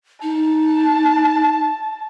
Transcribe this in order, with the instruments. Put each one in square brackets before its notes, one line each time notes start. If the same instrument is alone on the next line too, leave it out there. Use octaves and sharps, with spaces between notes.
[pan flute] D#4 [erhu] A5